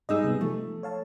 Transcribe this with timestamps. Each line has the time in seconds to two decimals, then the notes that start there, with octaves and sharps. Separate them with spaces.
0.09 G3 D#4 G#4 D#5 E6
0.24 C3 B3
0.41 F3 A3
0.83 C#5 F5 A5